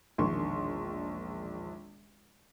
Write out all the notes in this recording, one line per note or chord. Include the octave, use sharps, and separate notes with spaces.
E1 A#1 D#3 D4 C6 C#6